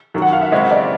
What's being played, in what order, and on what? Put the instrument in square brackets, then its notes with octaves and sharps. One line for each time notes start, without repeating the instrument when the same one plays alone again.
[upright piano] F#2 D#3 F#3
[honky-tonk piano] F#5
F5
E5
[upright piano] C#3 E3 G#3 C4 [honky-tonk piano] D#5
[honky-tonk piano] D5